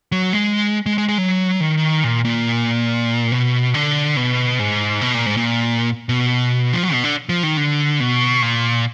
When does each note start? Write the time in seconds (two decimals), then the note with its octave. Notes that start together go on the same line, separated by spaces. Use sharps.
0.12 F#3
0.33 G#3
0.86 G#3
0.98 G#3
1.08 G#3
1.18 F#3
1.61 D#3
2.04 A#2
2.25 A#2
3.32 B2
3.74 D3
4.17 B2
4.59 G#2
5.01 B2
5.14 A#2
5.26 G#2
5.37 A#2
6.09 B2
6.73 F3
6.83 F#3
6.93 B2
7.04 D3
7.29 F3
7.43 D#3
7.57 D3
8.00 B2
8.42 A#2